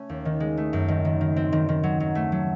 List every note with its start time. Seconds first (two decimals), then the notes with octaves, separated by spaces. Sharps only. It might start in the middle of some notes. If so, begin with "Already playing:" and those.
Already playing: A3 C#4
0.09 D#2
0.25 D#3
0.40 G#3
0.57 A3
0.73 F#2
0.88 D#3
1.05 D#3
1.21 D#3
1.36 C4
1.52 D#3
1.69 D#3
1.83 F#3
2.00 F#3
2.15 A3
2.32 F#3